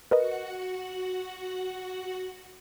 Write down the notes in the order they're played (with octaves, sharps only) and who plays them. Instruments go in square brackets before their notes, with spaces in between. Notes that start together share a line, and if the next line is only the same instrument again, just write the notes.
[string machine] F#4 F#5 [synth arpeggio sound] A#4 B4 D#5